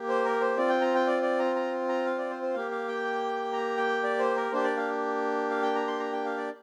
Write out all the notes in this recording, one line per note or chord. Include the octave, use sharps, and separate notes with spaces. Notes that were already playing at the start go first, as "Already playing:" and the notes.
Already playing: A#3 G4
C5
A#4
C5
C4 F4 D5
G5
A#5
G5
D5
D5
A#5
A#5
A#5
F5
D5
C5
C5
A#3 G4 F5
F5
G5
A#5
G5
D5
C5
A#4
A#3 D4 G4 C5
D5
F5
F5
G5
A#5
C6
A#5
G5
F5
D5